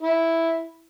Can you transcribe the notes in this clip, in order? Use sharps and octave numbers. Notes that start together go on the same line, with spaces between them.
E4